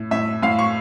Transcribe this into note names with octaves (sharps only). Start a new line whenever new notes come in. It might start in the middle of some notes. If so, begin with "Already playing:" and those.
Already playing: A2
A2 E5
A2 F5
C#6